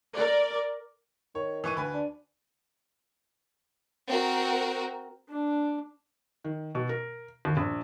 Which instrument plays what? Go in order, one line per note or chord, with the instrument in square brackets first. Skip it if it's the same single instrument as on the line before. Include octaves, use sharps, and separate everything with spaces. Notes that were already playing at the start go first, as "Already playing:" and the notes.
[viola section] A#4 D5
[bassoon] D#3 [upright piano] C#5
[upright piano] E3 C#6 D#7
D2 B4 G#5
[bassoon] D4
[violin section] C4 F#4 A#4
[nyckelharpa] D4
[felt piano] D#3
B2
A#4
D#2
A#1